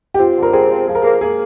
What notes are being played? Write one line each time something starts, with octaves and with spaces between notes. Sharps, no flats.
G4
C4 F4
D3
A#4
C4 G#4
F3
F3 G#4
A#4
A#3 G#4
A#3 G#4